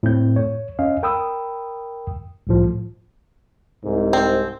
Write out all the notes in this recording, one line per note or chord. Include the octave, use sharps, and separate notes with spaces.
A2 C4 G6
C#5
C#4 D#5 F5
A#4 G5 B5 D#6 E6
C2 A2 F3
C2 G#2
C4